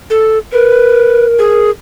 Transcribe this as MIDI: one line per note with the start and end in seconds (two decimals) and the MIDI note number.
0.10 0.38 69
0.53 1.69 70
0.53 1.26 71
1.39 1.70 68